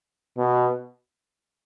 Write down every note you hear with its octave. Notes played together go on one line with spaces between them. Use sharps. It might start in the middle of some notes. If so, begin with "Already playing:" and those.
B2